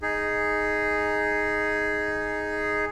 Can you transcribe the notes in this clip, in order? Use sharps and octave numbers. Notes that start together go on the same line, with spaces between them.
D#4 G#4